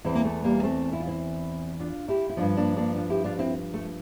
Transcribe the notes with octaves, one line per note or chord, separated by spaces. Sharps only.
E2 E3 C4 E4
A#3
A3
G3 A#3
A3 C4
E4
F4
C4 E4
D4 F4
E4 G4
E4
G2 F3 D4 F4
A#3 D4
A#3 D4
D4 F4
E4 G4
D4 F4
C4 E4
A3